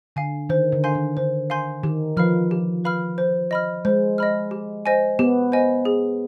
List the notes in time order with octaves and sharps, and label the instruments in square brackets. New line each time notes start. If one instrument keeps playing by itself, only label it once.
[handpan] D3 [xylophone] F5 G#5
[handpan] D#3 [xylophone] C5
[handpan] D3
[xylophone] F5 G#5 C6 G6
[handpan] D#3
[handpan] D3 [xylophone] C5
[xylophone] F5 G#5 C6 G6
[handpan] D#3 [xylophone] G4
[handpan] F3 [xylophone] B4 F5 B5 F6
[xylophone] G4
B4 F5 B5 F6
C5
D#5 B5 F6
[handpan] G#3 [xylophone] C5
[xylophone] D#5 B5 F6
G4
C5 D#5 G#5
[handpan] B3 [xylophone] G4
[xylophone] C5 D#5 G#5
G#4